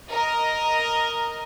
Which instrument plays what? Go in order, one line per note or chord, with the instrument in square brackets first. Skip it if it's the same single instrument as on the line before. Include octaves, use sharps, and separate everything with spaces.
[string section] A#4 D#5